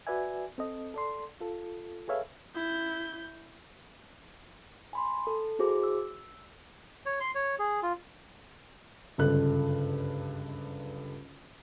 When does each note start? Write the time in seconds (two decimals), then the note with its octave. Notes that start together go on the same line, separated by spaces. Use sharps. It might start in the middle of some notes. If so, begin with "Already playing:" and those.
0.07 F#4 B4 D5 E5 G#5
0.58 C4 A4 D#5
0.94 A4 D5 C6
1.41 F4 A4
2.08 G#4 A4 B4 C#5 E5 F5
2.55 E4 G6
4.93 G#5 B5 C6
5.27 A4
5.59 E4 F#4 G#4 C5 D6
5.83 E6
7.06 C#5
7.20 C6
7.35 C#5
7.59 G#4
7.83 F4
9.18 F#1 C#2 G2 D3 A4 F#6